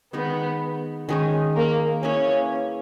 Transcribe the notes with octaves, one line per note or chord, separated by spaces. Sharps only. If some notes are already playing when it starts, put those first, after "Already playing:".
D#3 G#3 B3 D#4
D#3 G#3 C#4 D#4
A#3 A#4
A#3 C#4 E4 G#4 B4 C#5